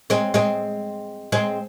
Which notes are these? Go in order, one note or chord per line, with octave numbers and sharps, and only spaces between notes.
G#3 C4
G#3 C4
G#3 C4